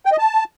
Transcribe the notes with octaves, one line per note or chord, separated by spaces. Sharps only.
G5
D#5
A5